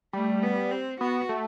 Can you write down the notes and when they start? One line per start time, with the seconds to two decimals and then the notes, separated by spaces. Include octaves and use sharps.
0.13 G3 A3
0.43 B3
0.72 C4
1.01 B3 F#4
1.29 A3